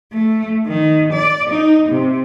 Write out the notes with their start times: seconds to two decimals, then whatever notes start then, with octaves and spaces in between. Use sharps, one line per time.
0.12 A3
0.67 D#3
1.12 D5
1.50 D#4
1.89 C3